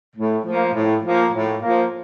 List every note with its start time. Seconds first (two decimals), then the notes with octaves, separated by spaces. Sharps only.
0.16 A2
0.45 F3 A#3
0.74 A2
1.04 F3 A#3
1.33 A2
1.62 F3 A#3